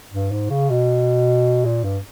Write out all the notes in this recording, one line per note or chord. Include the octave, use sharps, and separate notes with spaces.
G2
G#2
C#3
B2
A#2
G2